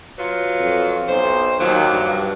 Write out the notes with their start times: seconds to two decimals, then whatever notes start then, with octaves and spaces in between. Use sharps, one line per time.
0.18 F#3 F4 B4
0.59 F2
1.08 B1 C5
1.60 D#2 F3 F#3
1.93 G2